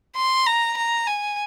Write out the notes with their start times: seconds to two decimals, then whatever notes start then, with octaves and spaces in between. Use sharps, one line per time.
0.16 C6
0.46 A#5
0.77 A#5
1.07 G#5